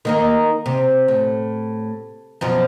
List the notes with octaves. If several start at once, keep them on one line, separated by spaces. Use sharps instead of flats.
D#3 A#3 D#4
C3
A2
F#2 B2 F3